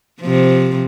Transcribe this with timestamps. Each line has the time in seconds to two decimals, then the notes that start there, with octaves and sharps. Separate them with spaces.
0.21 C3 F3